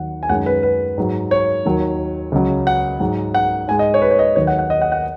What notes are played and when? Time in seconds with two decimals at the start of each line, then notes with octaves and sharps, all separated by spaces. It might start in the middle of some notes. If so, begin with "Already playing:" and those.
Already playing: D#2 D#3 F#3 F#5
0.23 G#5
0.29 F#2 D#3 G#3 F#5
0.46 B4
0.63 B4
0.98 G#2 F#3
1.31 C#5
1.65 D#2 D#3 F#3
2.32 C#2 C#3 F#3
2.67 F#5
3.00 G#2 F#3
3.34 F#5
3.68 G#2 G#3 G#5
3.79 D#5
3.94 C#5
4.02 B4
4.11 C#5
4.19 D#5
4.36 D#2 D#3 F#3 C#5
4.47 F#5
4.59 F#5
4.70 D#5
4.82 F#5
4.92 F#5